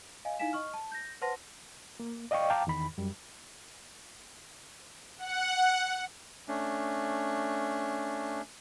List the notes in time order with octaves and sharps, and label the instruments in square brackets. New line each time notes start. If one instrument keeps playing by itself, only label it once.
[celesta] D#5 F5 G#5
D#4 E4 F5 G#5 B6 E7
D#5 C#6 F6
A5
G6 A#6
B4 C5 F#5 A5 C6 A#6
[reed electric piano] A#3
D5 D#5 F5 G5 C#6
F5 G5 A5 A#5 D6
E2 D#3 B5
F#2 G3
[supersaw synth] F#5
[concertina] A3 C#4 D4